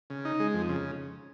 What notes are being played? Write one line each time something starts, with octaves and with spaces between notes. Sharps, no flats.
C#3
D#4
G#3
F2
C#3